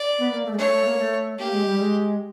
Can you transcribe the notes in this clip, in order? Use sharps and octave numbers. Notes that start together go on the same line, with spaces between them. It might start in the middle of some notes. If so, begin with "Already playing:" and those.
Already playing: D5
B3
A#3
A3
G#3
A3 C#5
A3
A#3
A3
A#3 G4
G#3
G3
G#3